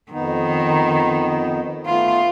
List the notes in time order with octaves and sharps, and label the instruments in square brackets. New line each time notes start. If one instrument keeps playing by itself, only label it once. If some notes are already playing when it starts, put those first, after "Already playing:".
[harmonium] F2 B3 D#4 [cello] D#3
[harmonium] A3 B3 [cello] F4